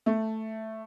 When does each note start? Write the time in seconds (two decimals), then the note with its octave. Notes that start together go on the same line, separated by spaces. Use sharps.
0.06 A3